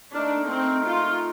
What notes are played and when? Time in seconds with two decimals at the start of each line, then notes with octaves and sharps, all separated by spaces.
0.14 A3 D4 D#4 A#4
0.50 C4
0.86 F4